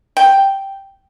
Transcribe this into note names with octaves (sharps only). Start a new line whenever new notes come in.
G5